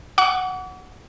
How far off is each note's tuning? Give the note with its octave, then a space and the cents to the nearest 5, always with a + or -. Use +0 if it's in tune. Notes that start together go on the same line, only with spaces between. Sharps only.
F#5 +0 D6 -45